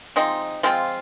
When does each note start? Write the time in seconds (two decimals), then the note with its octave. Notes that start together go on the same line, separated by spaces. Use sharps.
0.16 F3 G#3 C4 D#4
0.63 F3 G#3 C4 F4